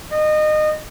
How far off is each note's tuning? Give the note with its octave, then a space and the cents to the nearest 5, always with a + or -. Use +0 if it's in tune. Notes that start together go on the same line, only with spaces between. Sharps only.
D#5 -25